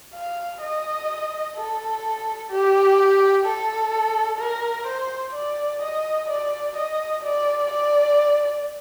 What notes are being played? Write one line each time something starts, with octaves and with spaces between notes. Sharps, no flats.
F5
D#5
A4
G4
A4
A#4
C5
D5
D#5
D5
D#5
D5
D5